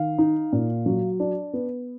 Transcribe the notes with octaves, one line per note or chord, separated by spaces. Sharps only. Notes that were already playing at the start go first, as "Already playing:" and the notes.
Already playing: D#3 F5
D#4
A#2
F#3
D4
B3